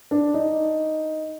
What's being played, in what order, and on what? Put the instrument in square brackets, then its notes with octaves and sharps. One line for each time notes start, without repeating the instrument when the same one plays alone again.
[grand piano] D4
D#4